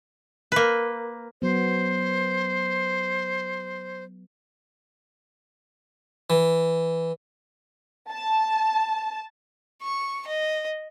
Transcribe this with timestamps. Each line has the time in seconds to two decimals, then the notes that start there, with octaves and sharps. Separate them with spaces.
0.52 A#3 B4
1.42 F#3 B3 C5
6.30 E3
8.11 A5
9.83 C#6
10.27 D#5